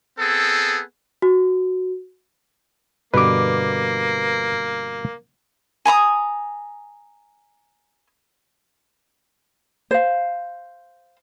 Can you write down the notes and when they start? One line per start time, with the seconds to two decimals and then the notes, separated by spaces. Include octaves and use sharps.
0.18 B3 C4 G#4 A4
1.22 F#4
3.14 G2 B2 D3 A#3 B4 D6
5.85 G#5 A#5 B5 D#6
9.91 C5 F5